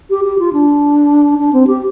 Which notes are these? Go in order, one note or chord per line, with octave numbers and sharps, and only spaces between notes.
G4
G4
F4
D4
D4
C4
G4